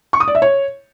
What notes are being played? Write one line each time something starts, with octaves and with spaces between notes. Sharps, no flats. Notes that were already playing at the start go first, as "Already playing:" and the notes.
C#6
D#6
D5
E5
C#5